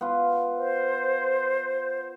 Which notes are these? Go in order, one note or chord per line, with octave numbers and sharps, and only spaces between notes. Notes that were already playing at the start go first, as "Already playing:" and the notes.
B3 F4
C5